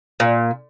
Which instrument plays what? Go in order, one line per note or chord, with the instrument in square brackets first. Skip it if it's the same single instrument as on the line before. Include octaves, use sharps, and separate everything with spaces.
[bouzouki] A#2